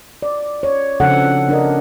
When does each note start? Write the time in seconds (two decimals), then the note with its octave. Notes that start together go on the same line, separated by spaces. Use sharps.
0.23 D5
0.63 C#5
1.00 C#3 F3 C4 D4 A4 F#5
1.49 D4 A#4 D#5